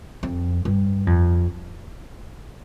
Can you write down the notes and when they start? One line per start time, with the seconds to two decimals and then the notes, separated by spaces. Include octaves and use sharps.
0.23 F2
0.65 G2
1.07 F2